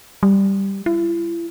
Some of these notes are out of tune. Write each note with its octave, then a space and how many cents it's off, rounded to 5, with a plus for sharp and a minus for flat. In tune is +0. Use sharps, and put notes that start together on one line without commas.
G3 +0
E4 +40